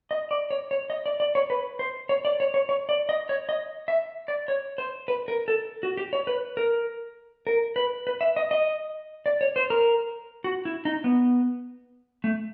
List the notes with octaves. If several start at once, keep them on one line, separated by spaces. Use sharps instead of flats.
D#5
D5
C#5
C#5
D#5
D5
D5
C#5
B4
C5
C#5
D5
C#5
C#5
C#5
D5
D#5
C#5
D#5
E5
D5
C#5
C5
B4
A#4
A4
F#4
G4
C#5
B4
A#4
A#4
B4
B4
E5
D#5
D#5
D5
C#5
C5
A#4
F#4
E4
D#4
B3
A3